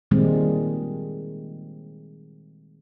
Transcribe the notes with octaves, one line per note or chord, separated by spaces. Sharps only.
A#2 D#3 G3 G#3 C4